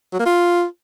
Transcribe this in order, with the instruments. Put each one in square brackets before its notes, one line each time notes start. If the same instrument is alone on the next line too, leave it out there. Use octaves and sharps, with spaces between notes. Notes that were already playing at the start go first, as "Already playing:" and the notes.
[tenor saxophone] F#3
A#3
F4